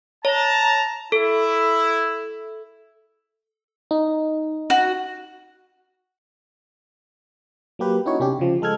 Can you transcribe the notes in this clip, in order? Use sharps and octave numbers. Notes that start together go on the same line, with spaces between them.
C#5 A5 A#5
E4 A4
D#4
F#4
F#3 A#3 G4 B4
C#4 D#4 E4 F#4 C#5
C3 C#4 D4 G4
C#3 F3
G#3 A4 F6 G#6